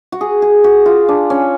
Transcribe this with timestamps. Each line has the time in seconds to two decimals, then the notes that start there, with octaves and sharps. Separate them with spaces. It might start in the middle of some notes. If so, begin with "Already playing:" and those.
0.12 F#4
0.21 G#4
0.42 G#4
0.64 F#4
0.86 F4
1.09 D4
1.30 C#4